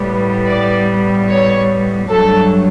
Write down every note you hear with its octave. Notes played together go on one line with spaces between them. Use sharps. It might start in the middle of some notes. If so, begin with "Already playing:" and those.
Already playing: A2 G3 B3
D5
C#5
G2 F#3 A3 A4